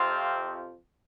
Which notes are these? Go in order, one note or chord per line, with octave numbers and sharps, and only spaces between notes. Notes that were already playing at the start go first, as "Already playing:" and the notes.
Already playing: F2 C3 F3 C4 F4